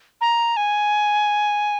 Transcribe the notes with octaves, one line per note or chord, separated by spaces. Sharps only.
A#5
G#5